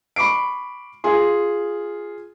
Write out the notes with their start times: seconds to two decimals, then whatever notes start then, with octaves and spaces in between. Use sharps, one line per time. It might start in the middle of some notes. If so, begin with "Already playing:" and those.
0.16 B5 C#6 D6 C7 D7
1.04 F4 G#4 C6